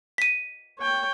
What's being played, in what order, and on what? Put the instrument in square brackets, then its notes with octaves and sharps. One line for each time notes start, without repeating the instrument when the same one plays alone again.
[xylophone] B6 D#7
[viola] C#5 G5